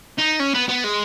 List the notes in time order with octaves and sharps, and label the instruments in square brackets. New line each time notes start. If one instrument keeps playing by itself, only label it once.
[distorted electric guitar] D#4
C#4
B3
B3
G#3